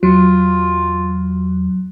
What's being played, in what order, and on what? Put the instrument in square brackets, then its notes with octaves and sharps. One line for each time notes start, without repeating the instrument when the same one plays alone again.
[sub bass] E2 [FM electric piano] F#3 [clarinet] F4